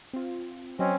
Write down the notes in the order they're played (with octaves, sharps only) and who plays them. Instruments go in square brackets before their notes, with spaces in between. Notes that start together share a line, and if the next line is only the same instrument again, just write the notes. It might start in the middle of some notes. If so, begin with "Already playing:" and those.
[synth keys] C4 F4
[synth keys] F#3 D#5 [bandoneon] C4 C#4